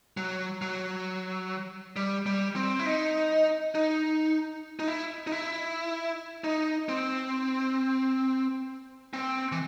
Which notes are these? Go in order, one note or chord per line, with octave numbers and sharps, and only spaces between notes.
F#3
F#3
G3
G3
C4
E4
D#4
D#4
D#4
E4
D#4
E4
D#4
C4
C4
E3